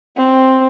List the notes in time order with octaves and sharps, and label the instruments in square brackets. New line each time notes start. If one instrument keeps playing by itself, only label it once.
[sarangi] C4